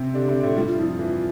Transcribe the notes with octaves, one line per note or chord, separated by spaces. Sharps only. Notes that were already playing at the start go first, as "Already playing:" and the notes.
Already playing: C3 C4
D3 D4 G4
C3 C4
A2 A3
G2 G3 F4
F4
F2 F3 E4
F4
E3